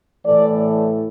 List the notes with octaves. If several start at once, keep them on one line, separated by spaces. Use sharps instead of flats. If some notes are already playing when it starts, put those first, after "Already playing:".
A2 E3 A3 D5